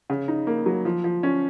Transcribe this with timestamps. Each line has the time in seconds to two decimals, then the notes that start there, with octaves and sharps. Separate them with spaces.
0.10 C#3
0.28 D#4
0.47 A#3
0.66 F#3
0.85 F3
1.04 F3
1.23 C#4